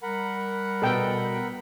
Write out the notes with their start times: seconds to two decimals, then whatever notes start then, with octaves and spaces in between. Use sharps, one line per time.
0.02 G3 A#4 F#5 B5
0.82 B2 A4 G5